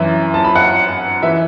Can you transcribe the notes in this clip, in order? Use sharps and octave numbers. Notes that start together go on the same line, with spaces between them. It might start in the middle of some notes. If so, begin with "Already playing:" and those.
Already playing: F#2 E3 E5
A5
B5
F#5
E3 E5